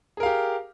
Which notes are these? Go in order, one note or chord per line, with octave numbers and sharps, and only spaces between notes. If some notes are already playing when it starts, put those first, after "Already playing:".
G4 G#4 A#4 F5